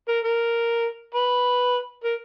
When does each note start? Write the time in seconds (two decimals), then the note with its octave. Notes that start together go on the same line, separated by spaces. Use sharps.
0.08 A#4
0.24 A#4
1.15 B4
2.04 A#4